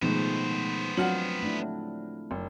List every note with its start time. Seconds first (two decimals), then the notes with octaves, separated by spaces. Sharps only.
0.02 B2 D#3 F3 G#3 A3 B3 C5
0.97 F#3 C4 D4 F4 F#5 F6 F#7
1.43 A3 D4 E4
2.31 F#1